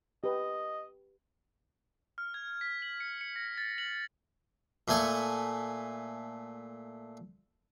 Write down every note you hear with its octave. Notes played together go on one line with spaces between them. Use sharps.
G4 B4 D#5
F6
G#6
B6
F#7
C#7
C#7
A#6
A6
F#7
A#2 A3 G#5 C#6